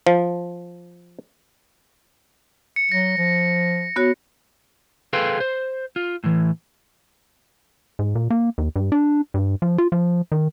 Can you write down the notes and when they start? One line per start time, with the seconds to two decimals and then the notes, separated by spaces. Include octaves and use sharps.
0.07 F3
2.76 C#7
2.92 F#3 A#6
3.18 F3
3.96 B3 F#4 C#5
5.13 G#4 A4 B4 F5 G5 C6
5.40 C5
5.96 F4
6.24 A2 E3
7.99 G#2
8.15 A#2
8.30 A#3
8.58 D#2
8.76 G2
8.92 D4
9.34 G2
9.62 F3
9.78 F4
9.92 F3
10.32 D#3